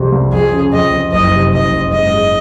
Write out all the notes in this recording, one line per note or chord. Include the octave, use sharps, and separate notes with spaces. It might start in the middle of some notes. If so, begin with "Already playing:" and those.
Already playing: C2 F2 C3 G#3
C2
F2 G#4
C#3
F2 D#5
F2
F#1 D#5
C3
F#1 D#5
F#1
G#2 D#5
G#3